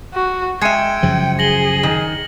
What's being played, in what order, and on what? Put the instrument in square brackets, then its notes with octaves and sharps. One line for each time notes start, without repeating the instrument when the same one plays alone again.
[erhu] F#4
[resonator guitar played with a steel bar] G#3 E5 [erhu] G5 [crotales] G#6 C#7 D#7
[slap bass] F#2 C#3 F3
[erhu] G#4 [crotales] A#6 F#7 G7
[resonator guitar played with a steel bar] D#3